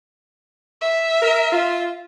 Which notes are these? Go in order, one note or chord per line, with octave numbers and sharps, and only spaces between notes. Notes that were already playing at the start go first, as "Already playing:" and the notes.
E5
A#4
F4